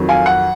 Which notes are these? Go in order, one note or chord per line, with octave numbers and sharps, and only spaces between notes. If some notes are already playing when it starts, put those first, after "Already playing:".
Already playing: F2 D#3 F#3
F5 G#5
F#5